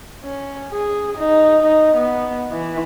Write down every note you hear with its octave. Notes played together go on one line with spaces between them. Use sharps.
C#4
G#4
D#4
D#4
B3
E3